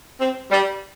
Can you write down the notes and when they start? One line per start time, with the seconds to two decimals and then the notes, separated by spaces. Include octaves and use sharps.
0.19 C4
0.51 G3